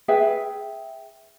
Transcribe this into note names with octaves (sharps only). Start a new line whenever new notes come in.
G#4 B4 E5 G5